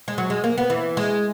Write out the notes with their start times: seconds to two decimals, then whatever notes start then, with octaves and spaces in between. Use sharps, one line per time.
0.08 G#3
0.18 F#3
0.30 G#3
0.44 A#3
0.58 B3
0.70 E3
0.97 G#3